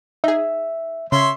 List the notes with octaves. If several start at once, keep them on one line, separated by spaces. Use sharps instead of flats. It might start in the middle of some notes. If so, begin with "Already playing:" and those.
D#4 G#4 E5
C#3 C#5 E5 C6